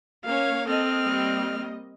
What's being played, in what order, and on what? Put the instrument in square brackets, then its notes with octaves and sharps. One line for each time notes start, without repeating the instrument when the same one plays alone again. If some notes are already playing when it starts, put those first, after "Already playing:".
[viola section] A#3 C#4 C#5 [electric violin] F5
[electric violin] C4 F6 [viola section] A4 D#5
[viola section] G3 A#3 D#5